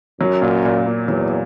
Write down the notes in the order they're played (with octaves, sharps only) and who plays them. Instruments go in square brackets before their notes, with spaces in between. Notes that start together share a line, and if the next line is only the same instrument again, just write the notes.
[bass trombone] F#2 [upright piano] F#3
[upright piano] A#2
A#2
A#3
[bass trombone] E2 [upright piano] F#3